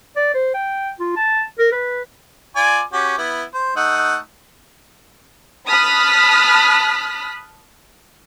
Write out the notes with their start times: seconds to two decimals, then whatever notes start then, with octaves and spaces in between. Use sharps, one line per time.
0.16 D5
0.34 C5
0.54 G5
1.00 F4
1.17 A5
1.59 A#4
1.72 B4
2.56 F4 D5 G#5
2.93 C#4 F#4 G4
3.18 B3 E4
3.54 C5
3.76 A3 D#4 F#5
5.69 A5 B5 D#6 F6 F#6 B6